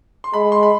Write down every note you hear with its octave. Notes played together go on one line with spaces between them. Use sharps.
C6
G#3 B5
C6
B5